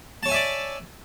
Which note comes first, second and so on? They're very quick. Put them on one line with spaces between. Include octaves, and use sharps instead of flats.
A5 C#5 G#5 E5 D5